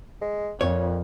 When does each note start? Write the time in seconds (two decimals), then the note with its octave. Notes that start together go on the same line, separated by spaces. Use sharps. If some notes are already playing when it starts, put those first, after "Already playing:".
0.21 G#3
0.61 F2 A#2 C#5